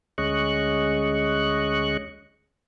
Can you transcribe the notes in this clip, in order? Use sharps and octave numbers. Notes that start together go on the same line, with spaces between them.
D2 G#3 C#4 D#5 C#6 F#6